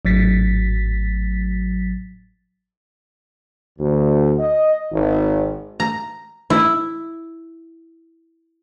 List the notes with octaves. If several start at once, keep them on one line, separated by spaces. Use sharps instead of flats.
G#1 A2 F#3 A6 B6
D2
D#5
G#1
A#5
E4